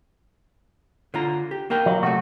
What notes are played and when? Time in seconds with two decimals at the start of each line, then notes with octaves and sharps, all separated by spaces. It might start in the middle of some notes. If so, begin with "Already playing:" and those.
1.14 D3 F4 A#5
1.51 G4
1.70 A#3 A#4 G5
1.86 F#3
2.03 C3 F#3 A3 F#4